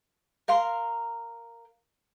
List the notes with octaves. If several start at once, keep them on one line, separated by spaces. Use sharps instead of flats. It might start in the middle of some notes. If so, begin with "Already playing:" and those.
A#4 F5 A#5 C6